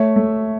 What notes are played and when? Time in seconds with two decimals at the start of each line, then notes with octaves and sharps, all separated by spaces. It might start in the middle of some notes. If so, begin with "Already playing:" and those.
Already playing: A3 C#5 E5
0.16 A3